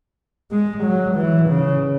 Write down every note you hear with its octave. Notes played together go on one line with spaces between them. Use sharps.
G#3
F#3
E3
C#3